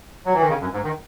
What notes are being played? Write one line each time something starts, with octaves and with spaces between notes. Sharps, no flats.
F#3
E3
D#3
C#3
F#2
G#2
D#3